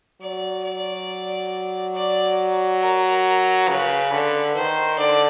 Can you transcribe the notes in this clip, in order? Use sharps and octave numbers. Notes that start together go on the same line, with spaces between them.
F#3 D5
D5
D5
A#4
C#3 B4
D3
D#3 C5
D3 D5